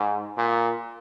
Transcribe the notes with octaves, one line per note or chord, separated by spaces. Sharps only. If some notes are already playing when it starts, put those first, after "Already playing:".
Already playing: G#2
A#2